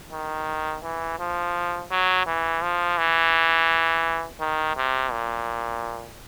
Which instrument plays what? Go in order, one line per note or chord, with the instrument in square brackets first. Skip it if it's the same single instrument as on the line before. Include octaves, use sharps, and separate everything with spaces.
[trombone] D#3
E3
F3
F#3
E3
F3
E3
D#3
C3
A#2